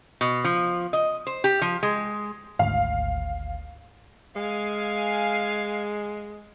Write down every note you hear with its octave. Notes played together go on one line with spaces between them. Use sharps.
B2
F3
D#5
C5
G4
F3
G#3
G#1 D2 F5
G#3 F5 G#5